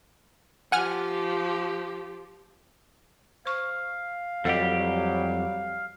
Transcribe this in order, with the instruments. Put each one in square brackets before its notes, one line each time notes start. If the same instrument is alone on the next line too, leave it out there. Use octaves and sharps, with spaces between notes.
[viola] F3 G4 [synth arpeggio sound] F#5 G#5 F6
[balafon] C5 C#6 [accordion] F5
[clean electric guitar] F2 G4 [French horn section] F#3 G3 [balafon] A4 D#5 F#5